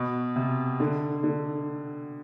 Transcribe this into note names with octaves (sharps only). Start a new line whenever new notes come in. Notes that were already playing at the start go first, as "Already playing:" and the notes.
Already playing: B2
C3
D3
D3